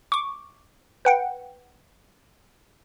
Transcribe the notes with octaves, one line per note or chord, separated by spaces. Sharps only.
C#6 D6
B4 F#5 G5